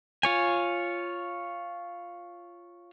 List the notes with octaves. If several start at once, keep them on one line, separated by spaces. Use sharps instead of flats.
F4 C#5 G#5